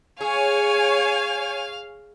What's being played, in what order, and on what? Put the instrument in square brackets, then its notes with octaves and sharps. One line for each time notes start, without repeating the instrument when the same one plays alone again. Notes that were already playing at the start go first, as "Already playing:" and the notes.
[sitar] G#4 [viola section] C#5 G#5 [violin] F5